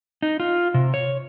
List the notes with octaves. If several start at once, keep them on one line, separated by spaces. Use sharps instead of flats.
D#4
F4
C3
C#5